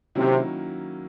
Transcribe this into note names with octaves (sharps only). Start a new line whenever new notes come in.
C3 D#3 F#3 A#3 C#4 E4